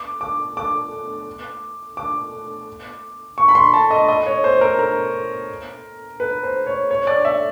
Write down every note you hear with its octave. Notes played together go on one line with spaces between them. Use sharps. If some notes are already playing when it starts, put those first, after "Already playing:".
Already playing: D6
D6
D6
D6
C#6
B5
C6
A5
D#5
D#5
C#5
C5
A#4
A#4
B4
C5
C#5
C#5
D5
E5